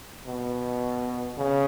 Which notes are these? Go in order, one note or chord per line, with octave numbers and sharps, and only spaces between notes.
B2
C#3